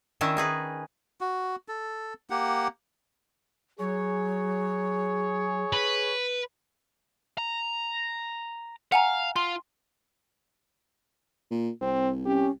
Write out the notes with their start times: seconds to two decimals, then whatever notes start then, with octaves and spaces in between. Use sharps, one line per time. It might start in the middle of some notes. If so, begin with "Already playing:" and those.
0.21 D#3 C#4 D4 E4
0.37 D#4 G#4 B4
1.21 F#4
1.68 A4
2.30 A#3 G4 F#5
3.79 F#3 G#4 C#5
5.73 B4
7.38 A#5
8.92 F5 F#5 G#5 A#5
9.36 F4 C6
11.51 A#2
11.81 C2 C4
12.25 C#4 G4